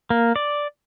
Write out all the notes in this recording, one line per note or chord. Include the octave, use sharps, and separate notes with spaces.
A#3
D5